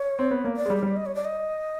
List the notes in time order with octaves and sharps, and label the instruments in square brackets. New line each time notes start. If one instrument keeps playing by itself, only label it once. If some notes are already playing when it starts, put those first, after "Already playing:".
Already playing: [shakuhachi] C#5
[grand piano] C4
B3
A#3
[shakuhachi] D5
[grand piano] G#3
G3
[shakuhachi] D5
[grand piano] G3
[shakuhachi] D#5
C#5
D5
D#5